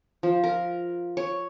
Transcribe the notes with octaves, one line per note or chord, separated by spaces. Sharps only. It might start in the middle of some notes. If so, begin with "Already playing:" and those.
F3
A#4
C#5